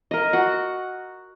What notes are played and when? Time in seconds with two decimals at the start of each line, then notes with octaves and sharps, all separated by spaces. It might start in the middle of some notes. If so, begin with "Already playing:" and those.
0.11 A#4 D#5
0.33 F#4 F#5